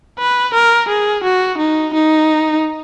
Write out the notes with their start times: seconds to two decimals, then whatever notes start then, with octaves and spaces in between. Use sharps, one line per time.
0.19 B4
0.54 A#4
0.89 G#4
1.24 F#4
1.58 D#4
1.94 D#4